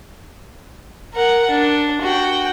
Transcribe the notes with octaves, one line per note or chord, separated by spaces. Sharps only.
A#4 F#5
D4
F#4 G5